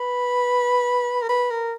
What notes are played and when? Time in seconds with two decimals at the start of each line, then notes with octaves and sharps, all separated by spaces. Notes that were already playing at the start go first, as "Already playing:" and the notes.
Already playing: B4
1.22 A#4
1.29 B4
1.51 A#4